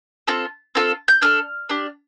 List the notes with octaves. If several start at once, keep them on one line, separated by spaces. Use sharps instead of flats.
C4 F4 A4
C4 F4 A4
G6
D4 A4 F6
D4 G4